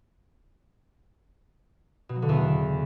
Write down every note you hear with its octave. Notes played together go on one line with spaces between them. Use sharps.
B2
F#3
D3
E2
C#3